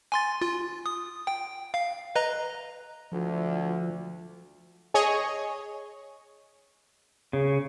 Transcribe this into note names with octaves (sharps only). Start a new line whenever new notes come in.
G#5 C6 A6
F4
D#6
G5
F5
B4 D#5 A#5
D2 F3
G#4 C#5 D#5
C#3